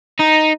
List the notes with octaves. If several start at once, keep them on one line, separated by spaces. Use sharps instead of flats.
D#4